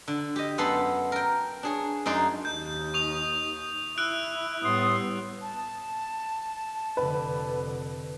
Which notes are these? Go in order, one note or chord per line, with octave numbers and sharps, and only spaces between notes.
D3
G4 D#5
F#2 B3 A4 B5 C6
A#4 G5
D4 G#4 C#5
F#2 D#4 D5 C6
D#2 D#4 G6
C#6 D#6 F7
E4 E6 F#6 D7
A2 G3 B3 C6 D#6
A5
F1 D3 B4